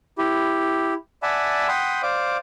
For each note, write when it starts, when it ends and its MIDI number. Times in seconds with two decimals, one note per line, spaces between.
0.18 0.94 64
0.18 0.94 67
1.23 1.68 74
1.23 1.68 76
1.23 1.68 78
1.23 1.68 80
1.23 1.68 81
1.23 1.68 83
1.68 2.02 78
1.68 2.02 79
1.68 2.02 83
1.68 2.02 84
1.68 2.02 87
1.68 2.02 91
2.03 2.37 72
2.03 2.37 74
2.03 2.37 77
2.03 2.37 86